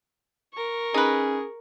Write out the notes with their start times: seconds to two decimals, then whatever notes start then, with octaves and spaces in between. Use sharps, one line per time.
0.53 A#4 C#6
0.94 C#4 D#4 G#4 B4